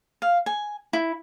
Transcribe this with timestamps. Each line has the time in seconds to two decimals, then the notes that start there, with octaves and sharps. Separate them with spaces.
0.22 F5
0.46 G#5
0.93 E4